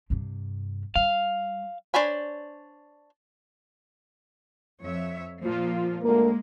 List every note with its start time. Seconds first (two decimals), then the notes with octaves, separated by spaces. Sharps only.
0.10 G2 C3
0.96 G3 F5
1.94 D4 C5 C#5 G#5 B5
4.82 F2 C#5 E5
5.41 A#2 F3 A#3 F4
6.03 D2 G#3 A#3 A#4